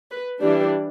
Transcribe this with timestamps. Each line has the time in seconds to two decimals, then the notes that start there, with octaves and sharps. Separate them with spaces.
0.11 B4
0.42 E3 G3 D4 G4